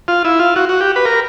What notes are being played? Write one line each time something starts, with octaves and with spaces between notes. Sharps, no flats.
F4
E4
F4
F#4
F#4
G4
B4
A#4